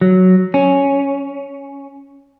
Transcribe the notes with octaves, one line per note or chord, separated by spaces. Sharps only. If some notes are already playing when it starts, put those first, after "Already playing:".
F#3
C#4